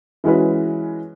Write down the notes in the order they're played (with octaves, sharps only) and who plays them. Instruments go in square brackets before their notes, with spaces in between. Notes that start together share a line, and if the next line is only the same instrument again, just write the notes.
[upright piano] E3 G#3 C#4 F#4 B4